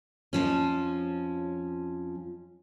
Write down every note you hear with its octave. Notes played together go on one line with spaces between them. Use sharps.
F2 G#2 F3 C#4